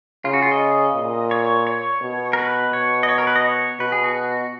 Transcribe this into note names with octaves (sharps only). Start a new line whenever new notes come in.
C#3 F4
F#4
F4
D#5
A#2
C#5
C#5
B2
A#4
B4
B2 C#5
D#5
C#5
A#4
B4
D#5
C#5
B2 B4
G#4
F#4